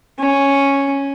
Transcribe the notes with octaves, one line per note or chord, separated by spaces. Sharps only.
C#4